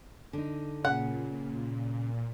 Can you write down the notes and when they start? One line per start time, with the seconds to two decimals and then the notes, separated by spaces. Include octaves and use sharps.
0.33 D3 D#4
0.85 A#2 C#3 F#5